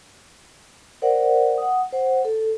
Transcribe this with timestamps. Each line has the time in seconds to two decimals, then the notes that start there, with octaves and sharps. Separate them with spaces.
1.02 A#4 C5 D5 F#5
1.58 F#5 D#6
1.92 C5 F#5
2.25 A4